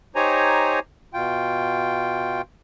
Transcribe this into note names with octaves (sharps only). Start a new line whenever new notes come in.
D#4 G4 C5 C#5 G#5 A#5
B2 F4 G5